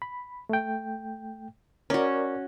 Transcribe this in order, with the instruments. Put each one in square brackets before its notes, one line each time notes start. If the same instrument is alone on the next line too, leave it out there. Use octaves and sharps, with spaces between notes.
[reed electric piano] B5
A3 G5
[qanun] C#4 F#4 [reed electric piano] A#4 D5